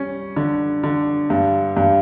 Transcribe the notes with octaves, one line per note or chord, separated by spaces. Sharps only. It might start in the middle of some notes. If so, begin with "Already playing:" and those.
Already playing: G3 C#4
D3
D3
G2
G2